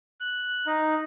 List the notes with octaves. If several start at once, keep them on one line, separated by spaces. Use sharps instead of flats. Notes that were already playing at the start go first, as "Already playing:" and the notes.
F#6
D#4